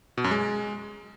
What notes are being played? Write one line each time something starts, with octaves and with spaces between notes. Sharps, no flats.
B2
F#2
G#3